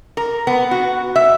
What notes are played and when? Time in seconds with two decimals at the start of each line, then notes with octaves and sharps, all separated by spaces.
0.17 A#4
0.47 B3
0.71 F#4
1.16 E5